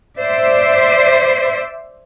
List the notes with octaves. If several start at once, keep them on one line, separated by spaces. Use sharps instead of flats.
C5 D5 E5